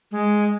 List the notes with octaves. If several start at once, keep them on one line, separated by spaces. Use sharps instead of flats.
G#3